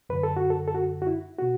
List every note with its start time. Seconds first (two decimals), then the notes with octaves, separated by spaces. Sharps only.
0.09 F#2 D3 B4
0.23 A4
0.37 F#4
0.50 A4
0.68 A4
0.75 F#4
1.02 F#4
1.07 E4
1.39 B2 F#4